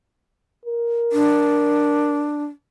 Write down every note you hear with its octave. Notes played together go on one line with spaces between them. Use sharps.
A#4
D4